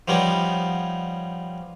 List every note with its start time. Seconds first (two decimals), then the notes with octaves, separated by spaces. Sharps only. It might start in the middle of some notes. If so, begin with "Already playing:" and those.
0.08 F3 G3 B3 C#4 D#4